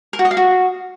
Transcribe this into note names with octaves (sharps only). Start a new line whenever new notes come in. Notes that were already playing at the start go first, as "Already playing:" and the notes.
A#4
F#4
D#5
F5
F#4